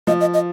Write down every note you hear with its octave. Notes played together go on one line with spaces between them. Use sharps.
F3 D#5
D#5
D#5